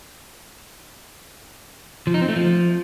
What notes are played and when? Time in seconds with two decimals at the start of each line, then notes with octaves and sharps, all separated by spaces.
2.07 F3
2.14 D#4
2.21 C4
2.29 A3
2.36 F3